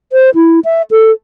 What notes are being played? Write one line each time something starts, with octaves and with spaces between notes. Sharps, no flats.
C5
E4
E5
A4